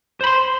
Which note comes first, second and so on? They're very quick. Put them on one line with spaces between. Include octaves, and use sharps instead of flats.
C5 B5 C6